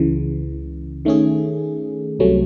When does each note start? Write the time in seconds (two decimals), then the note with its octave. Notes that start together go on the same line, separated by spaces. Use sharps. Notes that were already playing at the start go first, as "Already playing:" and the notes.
Already playing: C#2 C#3 E3
1.05 D#3 A3 C#4 G#4
2.19 C2 C3 F#3 A3 C#4